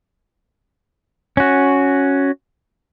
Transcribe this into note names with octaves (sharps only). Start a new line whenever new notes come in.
C#4 F#4